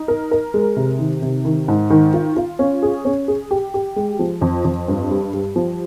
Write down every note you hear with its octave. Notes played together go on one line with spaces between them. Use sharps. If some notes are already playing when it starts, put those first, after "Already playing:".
Already playing: D#4
A#4
A#4
G#3
C3
D#3
C3
D#3
G#2
D#3
F4
F4
C#4
G#4
C#4
G#4
G4
G4
G#3
F3
F2
F2
G2
G3
G3
F3